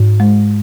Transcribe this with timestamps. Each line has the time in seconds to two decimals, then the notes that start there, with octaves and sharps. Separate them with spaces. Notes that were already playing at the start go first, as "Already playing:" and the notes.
Already playing: G#2
0.20 G#3